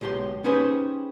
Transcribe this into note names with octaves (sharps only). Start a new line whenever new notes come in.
B1 G#3 G4 A#5 C6
C#4 D#4 G4 G#4 B4 C5